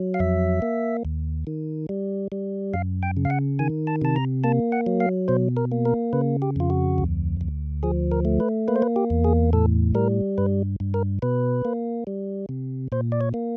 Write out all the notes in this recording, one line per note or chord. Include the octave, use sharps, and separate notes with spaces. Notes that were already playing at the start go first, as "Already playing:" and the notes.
Already playing: F#3
F5
F2 E5
A#3
D#2
D#3
G3
G3
F#2 F5
G5
C#3
F5
F#5
D#3 G#5
A5
C3 A5
A#5
A#3 A5
F#5
F#3
F5
B2 C5
A#4
A#3
A#4
C#3 B4
G4
F2 F4
F#4
D2
D2
F3 G#4
A#4
A3
B4
A#3 B4
C5
B4
G4
E2
G#4
A2 A4
G3 A#4
G2 B4
G2
A#4
B2 B4
A#3
G3
C3
A#2 C5
D5
C#5
A#3